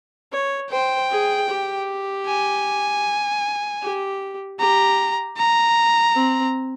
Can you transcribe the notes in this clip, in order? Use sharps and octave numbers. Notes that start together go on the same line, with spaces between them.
C#5
C5 G5
G#4
G4
G#5
G4
G4 A#5
A#5
C4